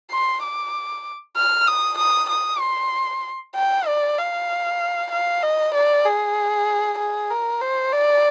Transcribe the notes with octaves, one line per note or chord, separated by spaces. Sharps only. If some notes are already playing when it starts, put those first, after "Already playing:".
C6
D6
F6
D#6
D#6
D#6
C6
G5
D5
F5
F5
D#5
D5
G#4
G#4
A#4
C5
D5